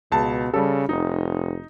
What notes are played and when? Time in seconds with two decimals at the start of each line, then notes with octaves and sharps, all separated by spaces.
0.12 C#2 B2 A5
0.53 C#3 G3 A4
0.89 F1 D#4